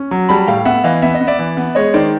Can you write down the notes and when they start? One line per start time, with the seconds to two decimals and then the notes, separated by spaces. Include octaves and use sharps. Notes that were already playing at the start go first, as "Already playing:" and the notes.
Already playing: C#4
0.11 F#3
0.29 G3 A5 B5
0.47 A2 F5 G5
0.65 B3 E5 F#5
0.84 E3 D#5 F5
1.02 B3 E5
1.14 D#5
1.21 B3
1.27 D5 E5
1.39 E3
1.57 B3
1.75 G#3 C#5 D#5
1.94 D#3 C5 D5